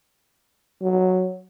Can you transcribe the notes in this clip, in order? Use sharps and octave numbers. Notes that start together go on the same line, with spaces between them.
F#3